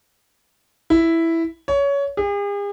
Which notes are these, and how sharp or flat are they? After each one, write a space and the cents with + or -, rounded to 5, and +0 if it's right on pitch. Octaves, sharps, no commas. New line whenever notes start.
E4 +0
C#5 +20
G#4 -45